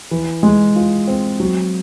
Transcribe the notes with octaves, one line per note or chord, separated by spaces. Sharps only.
E3
G#3
F4
C4
F#3